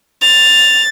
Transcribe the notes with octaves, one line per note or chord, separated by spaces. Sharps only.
A6 F7